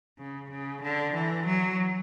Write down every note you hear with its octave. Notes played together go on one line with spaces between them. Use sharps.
C#3
C#3
D3
E3
F#3